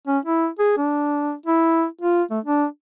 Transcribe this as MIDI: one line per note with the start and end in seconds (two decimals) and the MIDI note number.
0.07 0.19 61
0.25 0.47 64
0.59 0.74 68
0.77 1.34 62
1.46 1.85 64
2.01 2.23 65
2.31 2.39 57
2.45 2.66 62